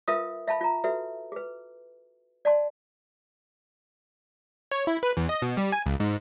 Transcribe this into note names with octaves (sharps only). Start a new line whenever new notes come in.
F4 A#4 B4 E5 F5 D#6
E5 F5 A5 B5
F4 A#5
F#4 A4 B4 E5
G#4 B4
D5 F#5 A5 C6
C#5
E4
B4
E2
D#5
B2
G3
G#5
C#2
G#2